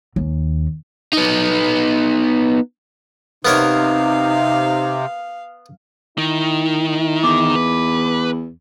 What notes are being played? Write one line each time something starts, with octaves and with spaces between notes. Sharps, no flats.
D#2
B3 D#4
C3 B3 D#4 A#4 C#5 F5
D#3 A#3 D#4 E4
E2 D6
B4